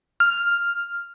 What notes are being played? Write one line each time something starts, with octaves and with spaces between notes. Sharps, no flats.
F6